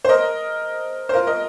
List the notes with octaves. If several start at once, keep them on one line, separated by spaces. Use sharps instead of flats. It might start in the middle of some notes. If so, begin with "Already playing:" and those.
C5
A#4 D#5
C5
F4 A#4
A#4 D#5